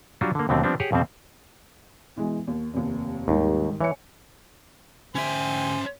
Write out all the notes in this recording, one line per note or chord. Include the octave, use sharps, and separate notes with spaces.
F#3 G3 D4 F4 F#4
D3 A#3
D#2 B2 D3 F#3 A3 C4
F3 G3 B3 C4 D4
G4 G#4 C#5 F#5
F2 B2 G3 C4 C5
B2 E3 G#3
D#2
F1 D#2
D#2 G#2 D#3 G3
E3 C#5 G#5 C#7
D2 C#4 G4 C5 E5 G#5